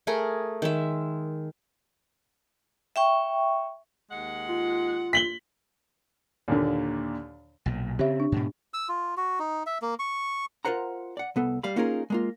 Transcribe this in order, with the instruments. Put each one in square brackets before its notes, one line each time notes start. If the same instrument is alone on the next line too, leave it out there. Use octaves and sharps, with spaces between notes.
[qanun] A3 G#4 A#4
D#3 G#3 E5
[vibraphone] E5 G5 C#6
[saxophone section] D#2 G#3 F#5
[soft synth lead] F4
[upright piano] B6 F#7 G7
[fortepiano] D#2 A#2 D3
[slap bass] B1 A#2
[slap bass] C#3 C4 [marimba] G4 C#5 E5
[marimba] D4
[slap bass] G#2 B2
[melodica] E6
F4
F#4
D#4
E5
A#3
C#6
[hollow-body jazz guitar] F4 A#4 C5 F#5 A#5
D5 F#5
C2 B3 A4
G3 F5 B5
A#3 C#4 D#4 F4 G#4 A#4
G#3 A#3 F4